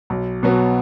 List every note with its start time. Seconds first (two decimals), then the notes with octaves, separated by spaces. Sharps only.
0.10 B1
0.43 B2 F#3 B3 F#4